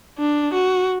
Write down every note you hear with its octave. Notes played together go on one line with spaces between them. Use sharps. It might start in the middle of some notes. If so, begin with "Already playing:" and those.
D4
F#4